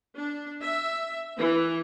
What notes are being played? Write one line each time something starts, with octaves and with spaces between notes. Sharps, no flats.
D4
E5
E3